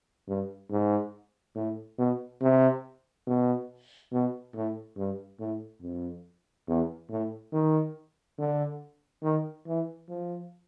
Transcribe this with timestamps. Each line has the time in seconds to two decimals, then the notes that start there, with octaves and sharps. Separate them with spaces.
0.28 G2
0.70 G#2
1.55 A2
1.98 B2
2.42 C3
3.27 B2
4.12 B2
4.54 A2
4.97 G2
5.40 A2
5.82 F2
6.68 E2
7.10 A2
7.53 D#3
8.38 D3
9.23 D#3
9.67 E3
10.09 F3